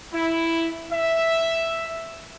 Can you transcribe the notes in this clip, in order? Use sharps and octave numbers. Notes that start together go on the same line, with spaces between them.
E4
E5